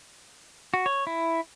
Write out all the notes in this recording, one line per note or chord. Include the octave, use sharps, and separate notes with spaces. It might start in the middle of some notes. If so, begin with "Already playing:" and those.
F#4
C#5
E4